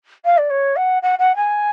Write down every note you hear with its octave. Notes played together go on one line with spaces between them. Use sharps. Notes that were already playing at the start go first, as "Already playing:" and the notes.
F5
D5
C#5
F#5
F#5
F#5
G#5